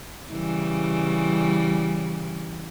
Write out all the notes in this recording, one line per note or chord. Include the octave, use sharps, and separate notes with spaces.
C#3 E3 G3